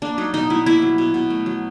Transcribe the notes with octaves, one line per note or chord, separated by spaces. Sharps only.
A#3 D4
F#3 D#4
B2 D#4
B2 E4
A#3 E4
F#3
B2
B2
A3
F#3